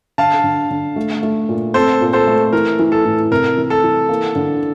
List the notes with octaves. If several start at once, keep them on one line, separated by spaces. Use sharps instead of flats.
D3 F5 A5
D3
D3
A3
A3
A#2
C4 A4 C5
A#2
A4 C5
A3
E3 A#4
E3
A4
A2
C3 A#4
E3
A4
E3
A#3
D3